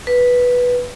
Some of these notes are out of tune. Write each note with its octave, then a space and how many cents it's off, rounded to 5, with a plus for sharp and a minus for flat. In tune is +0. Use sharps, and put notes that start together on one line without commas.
B4 -5